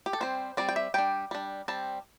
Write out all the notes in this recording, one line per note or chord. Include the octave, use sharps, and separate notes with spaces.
G4
A4
G3 C4 C5
G3 C4 D5
G5
E5
G3 D4 G5
G3 D4
G3 C4 A5